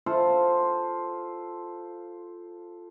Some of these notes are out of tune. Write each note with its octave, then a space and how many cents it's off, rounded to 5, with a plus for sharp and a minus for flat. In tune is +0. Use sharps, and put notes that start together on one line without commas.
F4 +0 A4 +0 C5 +0